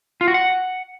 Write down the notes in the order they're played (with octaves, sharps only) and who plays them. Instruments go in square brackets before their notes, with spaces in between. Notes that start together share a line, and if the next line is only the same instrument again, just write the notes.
[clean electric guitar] F4
F#4
F#5